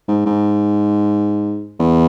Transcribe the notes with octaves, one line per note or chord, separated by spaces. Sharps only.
G#2
G#2
E2